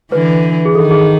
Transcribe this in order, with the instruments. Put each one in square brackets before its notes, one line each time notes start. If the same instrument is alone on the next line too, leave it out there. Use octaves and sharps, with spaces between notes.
[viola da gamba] D3 E3 [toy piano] B4
[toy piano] G#4
[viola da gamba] D#3 [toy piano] A4
[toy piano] G#4